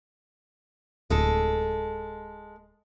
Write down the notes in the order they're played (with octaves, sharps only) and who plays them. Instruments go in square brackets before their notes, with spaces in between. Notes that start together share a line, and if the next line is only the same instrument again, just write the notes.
[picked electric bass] D1 [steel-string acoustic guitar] G#3 A4